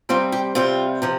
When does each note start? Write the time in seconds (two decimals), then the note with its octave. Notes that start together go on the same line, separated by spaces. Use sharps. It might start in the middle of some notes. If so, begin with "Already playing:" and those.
0.09 C3 G3 C4 F4
0.32 G4
0.55 C3 G3 C4 F4
1.02 C3 F3